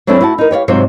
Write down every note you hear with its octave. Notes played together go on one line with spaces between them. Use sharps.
F#3 A3 C4 D4 E4 A4
E4 F#4 A5
D#4 A#4
G4 C#5 D5 F5
G#2 C3 F#3 F4 C5 E5